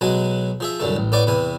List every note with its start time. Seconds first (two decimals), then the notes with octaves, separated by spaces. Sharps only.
0.01 B1 F#3 G#3 F#4 G#5
0.60 F3 G#4 E5
0.80 C2 F#2 D3 A3
0.96 A1
1.12 A2 B3 D5 G#5 C#6
1.27 E2 C3 B4 G#5